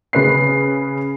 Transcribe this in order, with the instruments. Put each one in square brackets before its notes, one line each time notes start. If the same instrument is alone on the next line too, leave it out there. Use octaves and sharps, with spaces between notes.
[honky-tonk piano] C#3 B4 C7